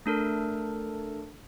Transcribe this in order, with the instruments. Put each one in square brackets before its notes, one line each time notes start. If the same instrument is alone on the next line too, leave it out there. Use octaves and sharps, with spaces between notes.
[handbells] A3 D4 A4 A#4